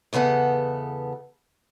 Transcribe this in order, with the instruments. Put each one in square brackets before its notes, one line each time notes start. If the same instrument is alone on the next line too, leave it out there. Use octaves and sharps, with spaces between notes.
[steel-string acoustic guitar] E2 C#3 B3 A4 F#5